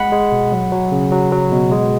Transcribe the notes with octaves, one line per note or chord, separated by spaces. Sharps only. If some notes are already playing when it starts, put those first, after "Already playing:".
Already playing: G#3 F#5 B5
G#3
B2
F#3
F#3
C#3
F#3
F#3
B2
G#3